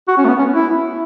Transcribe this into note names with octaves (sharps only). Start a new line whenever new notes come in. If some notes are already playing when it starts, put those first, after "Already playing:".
F#4
C#4
A3
B3
C#4
E4